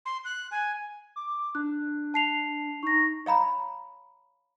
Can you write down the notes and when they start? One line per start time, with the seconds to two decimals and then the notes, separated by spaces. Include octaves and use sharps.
0.06 C6
0.25 F#6
0.51 G#5
1.16 D6
1.55 D4 F#6
2.14 A5 C7 F7
2.83 D#4 C#6 A#6
3.26 C#5 F5 A#5 B5